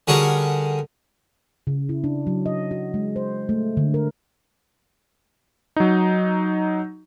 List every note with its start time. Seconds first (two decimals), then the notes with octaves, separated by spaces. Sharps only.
0.07 D3 G3 C#4 F#4 G#4 A#4
1.67 C#3
1.89 E4
2.04 D4
2.27 F#3
2.46 D#5
2.71 F#4
2.94 G#3
3.16 C5
3.49 A3
3.77 D3
3.94 A#4
5.76 F#3 D#4